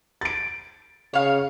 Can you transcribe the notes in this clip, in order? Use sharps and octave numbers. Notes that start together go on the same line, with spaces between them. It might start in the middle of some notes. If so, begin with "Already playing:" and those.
A6 D7
C#3 C#5 F5